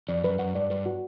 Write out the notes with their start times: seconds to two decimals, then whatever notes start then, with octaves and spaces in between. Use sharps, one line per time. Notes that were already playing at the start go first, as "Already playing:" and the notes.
0.08 F2 D5
0.24 F#2 B4
0.39 F#2 F#5
0.55 G2 D5
0.70 G2 B4
0.86 F#4